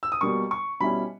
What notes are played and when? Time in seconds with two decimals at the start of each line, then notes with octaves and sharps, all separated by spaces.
0.03 E6
0.12 D#6
0.21 B2 G3 A#3 C#6
0.51 C#6
0.80 B2 G3 C#4 E4 B5